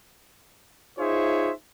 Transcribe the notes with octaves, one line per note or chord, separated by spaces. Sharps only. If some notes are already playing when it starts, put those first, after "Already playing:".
D#4 F4 G#4 C5 C#5 E5